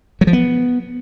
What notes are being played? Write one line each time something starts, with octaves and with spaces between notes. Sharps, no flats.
F#3
F3
B3